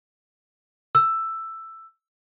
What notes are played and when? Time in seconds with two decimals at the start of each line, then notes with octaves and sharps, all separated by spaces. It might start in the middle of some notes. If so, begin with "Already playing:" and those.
0.95 E6